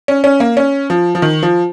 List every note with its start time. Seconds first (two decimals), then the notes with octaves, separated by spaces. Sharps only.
0.08 C#4
0.24 C#4
0.40 A#3
0.57 C#4
0.90 F3
1.15 F3
1.22 D#3
1.43 F3